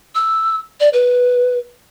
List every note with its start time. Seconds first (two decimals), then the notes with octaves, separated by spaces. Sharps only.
0.15 E6
0.80 D5
0.93 B4